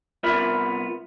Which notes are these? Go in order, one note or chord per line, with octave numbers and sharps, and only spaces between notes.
C2 B3 F4 A#4 E5 B5